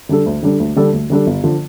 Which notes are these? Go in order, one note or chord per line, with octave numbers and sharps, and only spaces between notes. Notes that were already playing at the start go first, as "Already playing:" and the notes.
D3 G3 D4 A4
D2
D3 G3 D4 A4
D2
D3 G3 D4 A4
D2
D3 G3 D4 A4
G1
D3 F3